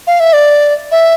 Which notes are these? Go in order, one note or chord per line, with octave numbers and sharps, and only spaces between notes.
F5
E5
D5
E5